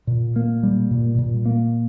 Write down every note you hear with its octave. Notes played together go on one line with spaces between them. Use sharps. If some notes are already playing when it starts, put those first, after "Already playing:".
A#2
A#3
G3
A#2
A#2
A#3